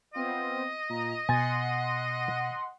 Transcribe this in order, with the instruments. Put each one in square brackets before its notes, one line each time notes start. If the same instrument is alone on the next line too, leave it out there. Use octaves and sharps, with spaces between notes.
[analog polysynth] B3 C4 F4 [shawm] D#5
[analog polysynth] A#2 A#5
[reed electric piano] B2 A6 [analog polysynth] F#5 C6 [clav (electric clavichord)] G#5